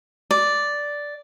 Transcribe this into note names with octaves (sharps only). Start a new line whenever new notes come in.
D5